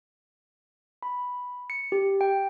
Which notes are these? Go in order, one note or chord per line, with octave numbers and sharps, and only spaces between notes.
B5
C#7
G4
G5